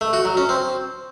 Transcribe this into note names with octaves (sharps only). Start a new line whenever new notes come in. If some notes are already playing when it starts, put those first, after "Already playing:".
A3
F#4
F#3
C#4
C4